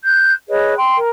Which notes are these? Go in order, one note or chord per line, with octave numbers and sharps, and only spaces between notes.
F#6 G6
G#4 B4 C#5 D#5
G5 C6
A#4